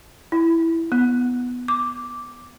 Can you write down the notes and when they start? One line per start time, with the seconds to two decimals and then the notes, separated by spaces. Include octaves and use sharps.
0.32 E4
0.92 B3
1.68 D6